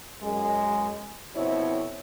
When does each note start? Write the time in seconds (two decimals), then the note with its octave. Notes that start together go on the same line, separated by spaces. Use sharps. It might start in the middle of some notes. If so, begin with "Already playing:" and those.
0.22 F#2 G#3
1.35 F2 B2 C4 E4 C#5